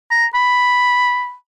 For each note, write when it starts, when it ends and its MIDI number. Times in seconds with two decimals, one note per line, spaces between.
0.11 0.26 82
0.34 1.34 83